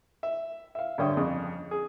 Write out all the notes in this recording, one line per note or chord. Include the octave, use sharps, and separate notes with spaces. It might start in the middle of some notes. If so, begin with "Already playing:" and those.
E5
E5 F5
G2 D3 C#4 E5 G5 D#6
F2 C#3 D#6
G#4